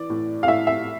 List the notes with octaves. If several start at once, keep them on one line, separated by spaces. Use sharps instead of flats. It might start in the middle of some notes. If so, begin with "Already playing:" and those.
Already playing: E3 D5
A2
F5
A2 E5
E5